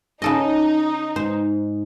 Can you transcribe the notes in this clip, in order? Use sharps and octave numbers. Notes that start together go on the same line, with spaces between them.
C#3 D#4 A4 D#5
G#2 C5